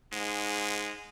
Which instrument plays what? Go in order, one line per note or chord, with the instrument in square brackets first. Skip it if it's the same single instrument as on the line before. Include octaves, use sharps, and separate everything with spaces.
[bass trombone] G#2 [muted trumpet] G#3